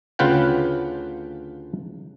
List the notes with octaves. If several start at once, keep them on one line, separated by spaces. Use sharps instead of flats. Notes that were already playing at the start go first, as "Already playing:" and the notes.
D2 C#3 F4 B4 F#5 G5